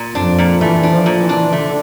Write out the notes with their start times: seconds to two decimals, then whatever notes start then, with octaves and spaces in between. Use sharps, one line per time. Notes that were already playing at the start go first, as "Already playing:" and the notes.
Already playing: A#2
0.14 F2 D4
0.38 A#2
0.61 E3 A3
0.83 D4
0.91 F3
1.06 A#2
1.22 E3
1.29 D4
1.52 D3 A3